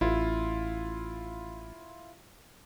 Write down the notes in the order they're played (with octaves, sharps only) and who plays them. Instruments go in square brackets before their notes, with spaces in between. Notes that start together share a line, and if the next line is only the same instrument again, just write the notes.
[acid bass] A1 [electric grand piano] E4 F4